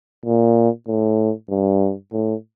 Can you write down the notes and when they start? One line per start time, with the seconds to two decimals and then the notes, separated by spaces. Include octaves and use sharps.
0.26 A#2
0.88 A2
1.50 G2
2.13 A2